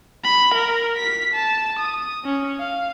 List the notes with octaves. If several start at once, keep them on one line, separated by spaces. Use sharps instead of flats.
B5
A#4
B6
A5
D#6
C#4
F5